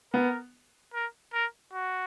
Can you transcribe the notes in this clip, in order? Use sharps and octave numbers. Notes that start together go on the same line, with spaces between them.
B3 A#4
A#4
A#4
F#4